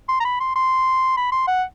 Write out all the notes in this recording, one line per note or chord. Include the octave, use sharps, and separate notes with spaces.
C6
A#5
B5
C6
C6
B5
C6
F#5